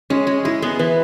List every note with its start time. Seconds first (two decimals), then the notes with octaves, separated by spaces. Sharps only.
0.10 G#3 C#4
0.27 G#3
0.45 G#3 E4
0.62 B3 G#4
0.79 E3 B4